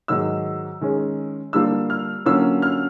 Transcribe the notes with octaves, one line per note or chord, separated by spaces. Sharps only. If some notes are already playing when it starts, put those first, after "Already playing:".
G#2 D#3 F#3 E6
D#3 G#3 C#4
D3 G3 A#3 D4 F4 E6
F6
D3 F#3 A#3 C#4 F4 E6
F6